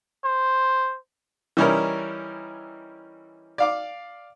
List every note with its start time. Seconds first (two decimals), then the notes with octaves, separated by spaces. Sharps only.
0.24 C5
1.57 E3 G3 C#4 D#4 E4 A#4
3.58 D5 F5 D6